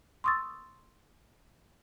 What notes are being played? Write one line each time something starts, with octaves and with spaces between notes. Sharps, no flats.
C6 C#6 D#6 E6 A6